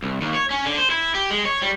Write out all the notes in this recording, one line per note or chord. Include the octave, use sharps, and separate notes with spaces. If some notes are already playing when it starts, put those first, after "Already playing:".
C2
D#2
C#5
C#4
D3
C5
E4
G4
G#3
C#5
G3